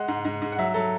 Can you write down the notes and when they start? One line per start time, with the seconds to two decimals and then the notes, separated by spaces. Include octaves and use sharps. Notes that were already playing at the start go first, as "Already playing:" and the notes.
Already playing: G#3 F#5
0.08 G#2
0.25 G#2
0.42 G#2
0.52 F#5
0.58 F#3 E5
0.74 F#3 A4